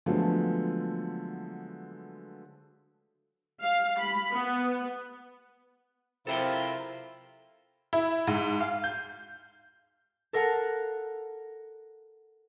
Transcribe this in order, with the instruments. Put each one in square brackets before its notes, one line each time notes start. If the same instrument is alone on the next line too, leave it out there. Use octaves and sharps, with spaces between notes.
[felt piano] D3 F3 F#3 G#3 A3 B3
[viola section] F5
B5
B3
[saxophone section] C3 [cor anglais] E4 [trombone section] F4 A#4 [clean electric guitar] A4 C5 G5
[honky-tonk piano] E4
G#2
F5
G6
[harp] A4 A#4 F5 F#5 A5